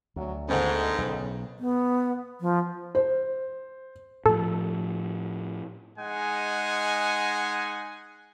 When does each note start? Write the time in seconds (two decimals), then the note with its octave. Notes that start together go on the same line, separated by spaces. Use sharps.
0.16 D2 F#3
0.48 G#2 D3 D#3 B3 A4
0.98 B1 C#3
1.60 B3
2.41 F3
2.95 C5
4.26 A2 F3 A4
5.98 G#3 D#4 F#5 G#5